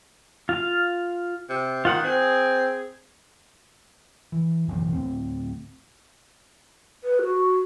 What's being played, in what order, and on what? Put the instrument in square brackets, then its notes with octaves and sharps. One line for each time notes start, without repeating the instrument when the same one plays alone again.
[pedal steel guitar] F4 F5
[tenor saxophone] C3
[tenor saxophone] D#3 [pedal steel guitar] F4 F#5
[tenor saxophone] C4 [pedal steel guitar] G#4
[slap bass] E3
F#1 B1 A2 E3
D1 C4
[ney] B4
F#4